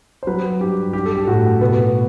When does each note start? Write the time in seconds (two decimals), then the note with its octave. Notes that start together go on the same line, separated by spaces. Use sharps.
0.23 C5
0.27 F#3 B4
0.60 G2 G4
0.93 G3 G4
1.06 A4
1.17 G4
1.27 A2 F#4
1.61 B2 B3